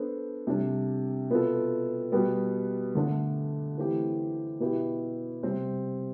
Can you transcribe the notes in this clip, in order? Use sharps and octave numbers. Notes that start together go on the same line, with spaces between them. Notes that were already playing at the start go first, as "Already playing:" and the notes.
Already playing: B3 D4 A4 C5
C3 G3 D4
B2 B3 F4 A4
B2 G3 B3
D3 A3 D4
E3 A3 C4 E4 G4
B2 B3 E4 G4
C3 G3 C4